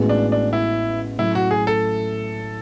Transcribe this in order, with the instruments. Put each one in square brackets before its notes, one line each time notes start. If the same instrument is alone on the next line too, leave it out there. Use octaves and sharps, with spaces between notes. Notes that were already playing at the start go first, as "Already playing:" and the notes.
Already playing: [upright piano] A1 A2 G#3 B3 F#4
[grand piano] D4
D4
E4
[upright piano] A2 F#3 A3 [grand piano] E4
[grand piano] F#4
G#4
A4